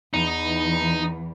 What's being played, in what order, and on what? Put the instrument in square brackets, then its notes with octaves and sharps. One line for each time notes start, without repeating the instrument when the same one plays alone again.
[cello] E2 E3 [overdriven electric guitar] D#4